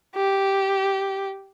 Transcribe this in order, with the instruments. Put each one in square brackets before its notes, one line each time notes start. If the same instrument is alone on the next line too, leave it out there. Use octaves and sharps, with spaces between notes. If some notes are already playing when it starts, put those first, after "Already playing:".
[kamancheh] G4